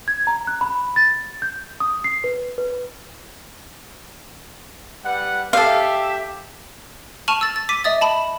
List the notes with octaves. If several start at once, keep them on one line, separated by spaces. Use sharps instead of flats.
G#6
A#5
F#6
B5
A6
G6
D#6
C7
B4
B4
G3 B4 F#5
G4 A4 E5 F5
A5 C#6 F6 D#7 F7 F#7
E6 A6
A6
D6 B6 D#7
D#5 E5 D#6 A6
A5 B5